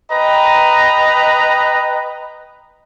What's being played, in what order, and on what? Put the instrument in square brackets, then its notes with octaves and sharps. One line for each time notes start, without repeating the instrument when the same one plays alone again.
[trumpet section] B4 D#5 G5 A#5